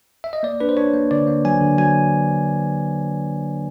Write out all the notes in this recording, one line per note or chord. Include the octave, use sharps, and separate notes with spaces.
E5
D#5
A#3 D5
D4 B4
C5
D4 C#5
A#3
D3 D5
A#3
F#3 G#5
D3
F#3 G#5